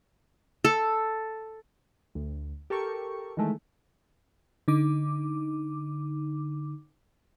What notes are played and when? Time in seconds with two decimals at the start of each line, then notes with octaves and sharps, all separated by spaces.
0.65 A4
2.15 D2
2.70 G4 A4 A#4 C#6
3.37 D#3 E3 G#3 A3
4.68 D3 D#4 D6